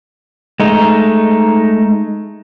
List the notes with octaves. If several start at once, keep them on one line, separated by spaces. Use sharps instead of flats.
G#3 A3 D#4